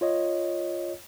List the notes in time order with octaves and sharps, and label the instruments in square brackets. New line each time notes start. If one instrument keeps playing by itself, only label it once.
[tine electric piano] F4 C#5 D#5